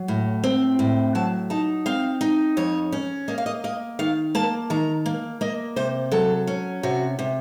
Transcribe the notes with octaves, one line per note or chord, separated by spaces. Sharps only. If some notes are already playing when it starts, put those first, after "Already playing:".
Already playing: F#3
A2
C4
A2
F#3 A5
D#4 A5
C4 F5
D#4
F2 C#5
C#4
A#3 D#5
F5
D#5
A#3 D#5
D#3 F5
A#3 A5
D#3 A#5
A#3
A#3 D#5
C3 C5
F#3 A4
C#4
C3 F#4
C3